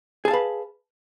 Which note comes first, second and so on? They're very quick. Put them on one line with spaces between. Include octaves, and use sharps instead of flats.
G#4 A5 F5 B4